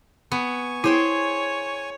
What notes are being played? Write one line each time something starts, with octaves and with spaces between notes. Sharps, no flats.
B3 G#5 C#6
E4 G#4 C5 C#5 G5